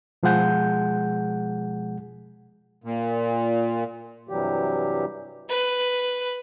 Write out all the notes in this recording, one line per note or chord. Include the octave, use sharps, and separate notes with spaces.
B2 F3 G#3 G#4 F#5 G6
A#2
G2 C3 E3 F#3 G3 G4
B4